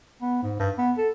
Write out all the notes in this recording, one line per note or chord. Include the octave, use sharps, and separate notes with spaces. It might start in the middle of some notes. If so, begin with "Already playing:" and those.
B3
G#2
G2
B3
A4